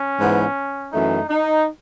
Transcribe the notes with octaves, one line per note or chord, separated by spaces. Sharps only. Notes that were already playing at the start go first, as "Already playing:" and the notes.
Already playing: C#4
G#2 E3 B3
F#2 E3 A3 D#4
D#4